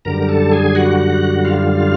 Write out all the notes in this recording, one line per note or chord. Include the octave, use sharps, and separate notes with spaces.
F#2 D3 G3 A#4 A#5
A4 A5
G#4 G#5
F#4 F#5
F4 F5